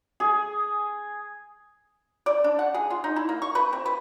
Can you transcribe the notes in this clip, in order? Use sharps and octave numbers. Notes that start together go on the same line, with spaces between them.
G#4
D5
D4
F#5
G#4
F4
D#4
E4
A#3
C#6
B4
C4
B4